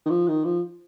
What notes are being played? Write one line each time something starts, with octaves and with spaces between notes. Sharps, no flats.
D#3
F3
D#3
F3